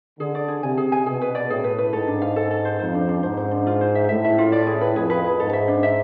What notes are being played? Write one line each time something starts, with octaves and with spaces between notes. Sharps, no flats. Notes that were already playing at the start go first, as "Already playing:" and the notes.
D3 G#4
D5
G#4
C3 G#5
G#4
G#5
B2 G#4
B4
D5
A2 G#4
B4
B4
G#2 A4
D4
F5
A4
A4
C5
F2 C5
D4
D4
G#2 C5
C5
D4
F4
C5
E5
A2 E5
E5
F4
D5
G#4
B4
F2 G#4
B4
G#4
G#2 A4
E5
D4
E5